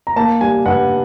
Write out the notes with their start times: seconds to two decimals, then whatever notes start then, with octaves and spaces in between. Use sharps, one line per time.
0.07 A#5
0.16 A#3 A5
0.41 G3 G#5
0.66 G2 F#5